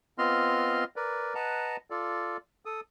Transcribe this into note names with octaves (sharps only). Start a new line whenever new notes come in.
B3 C4 F4 D#5 C6 F6
A#4 B4 D5
B4 D#5 F#5 A5 A#5
F4 A4 D5
A4 D#6